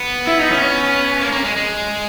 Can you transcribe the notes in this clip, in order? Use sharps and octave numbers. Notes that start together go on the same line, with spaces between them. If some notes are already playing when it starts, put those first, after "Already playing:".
Already playing: B3
E4
D#4
C#4
C#4
A#3
A#3
G#3
G#3